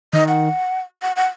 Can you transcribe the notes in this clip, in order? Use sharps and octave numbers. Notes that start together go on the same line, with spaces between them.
D#3 D#5
F#5
F#5
F#5